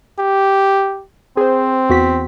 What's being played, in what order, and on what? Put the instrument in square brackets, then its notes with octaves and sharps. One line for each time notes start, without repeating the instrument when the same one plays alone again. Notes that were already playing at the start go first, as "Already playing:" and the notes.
[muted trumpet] G4
[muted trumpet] C4 [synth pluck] G#4 C5
[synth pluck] E2 F#4 B6